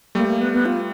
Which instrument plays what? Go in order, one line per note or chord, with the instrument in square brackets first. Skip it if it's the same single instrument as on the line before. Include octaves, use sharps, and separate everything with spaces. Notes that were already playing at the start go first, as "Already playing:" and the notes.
[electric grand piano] G3 A3 [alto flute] A#3
[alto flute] A#3
B3
B3
F4